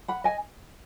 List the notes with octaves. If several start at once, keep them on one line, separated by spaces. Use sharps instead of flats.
F#5 B5
D#5 G#5